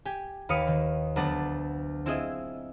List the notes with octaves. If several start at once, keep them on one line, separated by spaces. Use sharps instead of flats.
G4 G#5
D#2 B4 F5 D#6 C#7 D7
D#3
D2 F#3 B3 D4 F#5 A5
C4 E4 F4 G#4 D#5 E5